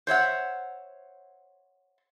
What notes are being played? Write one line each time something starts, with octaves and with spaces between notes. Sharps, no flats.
C5 C#5 E5 F#5